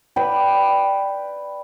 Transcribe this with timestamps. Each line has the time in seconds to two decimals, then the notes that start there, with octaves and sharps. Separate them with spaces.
0.16 B4 D5 G5 B5